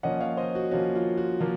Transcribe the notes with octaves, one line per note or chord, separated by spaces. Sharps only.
F3 A#3 C#4 D#5 F#5
C#5 F5
C5 D#5
F#4
F3 A#3 C#4 F#4
F4
F#4
F3 A#3 F4